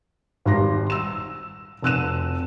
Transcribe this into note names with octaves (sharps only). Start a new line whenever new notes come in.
G#1 G3 C6 A#6
E6 E7
F1 C4 E6 F#6 D#7 E7